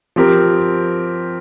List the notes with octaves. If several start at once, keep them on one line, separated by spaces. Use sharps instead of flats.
F3 C4 G4 A#4